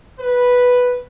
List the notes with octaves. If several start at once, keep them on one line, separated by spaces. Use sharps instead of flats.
B4